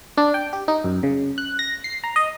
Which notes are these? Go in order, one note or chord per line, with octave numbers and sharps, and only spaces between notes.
D4
G5
G4
D#4
F#2
C#3
F#6
A#6
C7
A#5
D#5